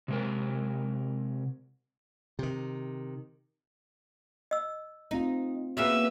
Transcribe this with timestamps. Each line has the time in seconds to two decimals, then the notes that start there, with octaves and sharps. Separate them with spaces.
0.08 C3 G#3 A#4
2.39 C3 D#3
4.51 D#5 E6
5.11 A3 C4 D#4 F4
5.77 A#3 B3 C#4 F#4 G#4 B4 E5